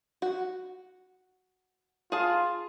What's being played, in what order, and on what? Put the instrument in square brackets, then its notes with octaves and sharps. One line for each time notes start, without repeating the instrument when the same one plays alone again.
[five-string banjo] F#4
[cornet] F4 [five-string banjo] G#4 A5